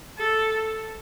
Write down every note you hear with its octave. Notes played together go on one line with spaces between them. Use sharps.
A4